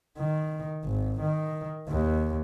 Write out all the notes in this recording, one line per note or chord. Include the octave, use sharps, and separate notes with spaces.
D#3
G#1
D#3
D#2